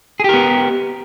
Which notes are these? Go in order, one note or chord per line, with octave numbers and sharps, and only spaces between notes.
B3 G4 G#4 A#4